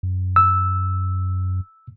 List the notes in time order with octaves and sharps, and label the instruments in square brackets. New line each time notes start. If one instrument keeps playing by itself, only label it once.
[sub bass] F#2
[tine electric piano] E6